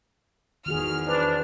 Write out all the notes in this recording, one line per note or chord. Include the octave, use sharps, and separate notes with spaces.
E2 D#3 F#4 G#4 F6
D4 B4 C5